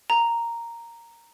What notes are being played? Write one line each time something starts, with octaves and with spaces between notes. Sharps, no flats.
A#5